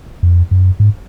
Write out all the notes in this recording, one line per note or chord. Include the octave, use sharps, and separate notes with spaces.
F2
F#2
G#2